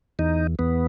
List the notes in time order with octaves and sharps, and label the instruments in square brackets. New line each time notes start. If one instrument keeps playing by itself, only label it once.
[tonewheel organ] E2 D#4
E2 B3